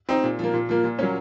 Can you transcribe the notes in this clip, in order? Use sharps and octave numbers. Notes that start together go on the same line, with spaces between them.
C4 D#4
A#2
F3 A#3
A#2
F3 A#3
A#2
F#3 A#3 C#4